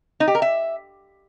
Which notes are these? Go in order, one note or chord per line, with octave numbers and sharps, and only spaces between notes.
D#4
G4
A#4
E5